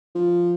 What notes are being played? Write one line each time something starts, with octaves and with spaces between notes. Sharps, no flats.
F3